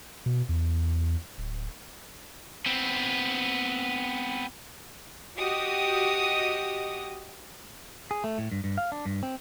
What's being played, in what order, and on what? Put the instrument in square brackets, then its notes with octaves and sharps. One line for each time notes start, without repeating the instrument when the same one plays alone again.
[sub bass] B2
E2
D1
[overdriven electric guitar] B3 C4
[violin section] F#4 G4 D#5 D#6
[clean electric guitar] G#4
A3
A2
G2
G2
F5
D4
G2
C4